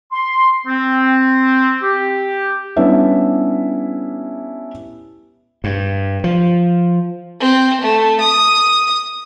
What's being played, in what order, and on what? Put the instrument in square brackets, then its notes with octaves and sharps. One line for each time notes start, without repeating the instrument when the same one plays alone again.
[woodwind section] C6
C4
G4
[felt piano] G3 B3 C#4 D4 E4 E5
[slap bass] G2
F3
[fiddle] C4
A3
D#6